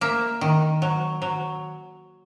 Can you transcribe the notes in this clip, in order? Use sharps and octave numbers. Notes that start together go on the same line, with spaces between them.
A#3 E5
D#3
F#3
F#3